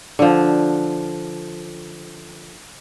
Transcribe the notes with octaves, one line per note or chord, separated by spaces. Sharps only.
D3 F3